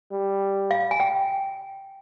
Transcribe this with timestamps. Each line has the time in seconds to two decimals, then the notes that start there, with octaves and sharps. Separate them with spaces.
0.12 G3
0.71 F5
0.91 G#5
1.00 G5